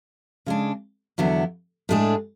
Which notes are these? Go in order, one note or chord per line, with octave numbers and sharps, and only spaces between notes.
C#3 G#3 D4
E2 D3 F#3 B3 E4
A2 G#3 D4 G#4